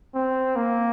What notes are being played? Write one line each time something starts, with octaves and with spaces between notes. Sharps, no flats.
C4
A#3